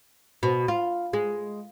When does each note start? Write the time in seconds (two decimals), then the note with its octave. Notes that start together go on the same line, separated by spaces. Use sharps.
0.43 B2
0.68 F4
1.13 G#3